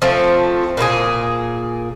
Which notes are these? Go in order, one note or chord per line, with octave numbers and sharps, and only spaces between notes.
F3 A3 C4
A#2 A#3 E4 G#4